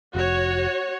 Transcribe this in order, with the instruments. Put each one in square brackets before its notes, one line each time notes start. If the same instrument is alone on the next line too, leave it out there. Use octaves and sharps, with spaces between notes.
[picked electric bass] F1 [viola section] F#4 C#5